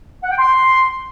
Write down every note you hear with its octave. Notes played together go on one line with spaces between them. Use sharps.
F#5
G5
C6